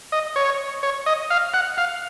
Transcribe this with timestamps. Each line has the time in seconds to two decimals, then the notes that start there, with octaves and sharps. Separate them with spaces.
0.12 D#5
0.36 C#5
0.83 C#5
1.06 D#5
1.30 F5
1.54 F#5
1.78 F5